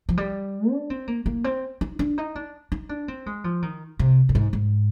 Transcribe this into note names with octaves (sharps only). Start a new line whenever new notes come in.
F3
G3
D4
C4
A#3
A#3
C4
D#4
D4
D#4
D4
D#4
D4
C4
G#3
F3
D#3
C3
A#2
G#2
G#2